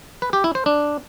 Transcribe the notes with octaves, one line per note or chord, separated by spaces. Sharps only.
B4
G4
E4
C5
D4